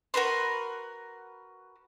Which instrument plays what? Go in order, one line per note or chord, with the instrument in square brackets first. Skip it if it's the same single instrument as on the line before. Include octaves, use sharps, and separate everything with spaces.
[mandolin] F#4 A#4 B4 C6